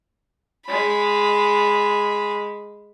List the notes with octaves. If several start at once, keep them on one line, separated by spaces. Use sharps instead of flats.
G#3 B5